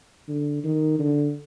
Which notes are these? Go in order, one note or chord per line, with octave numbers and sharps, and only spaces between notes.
D3
D#3
D3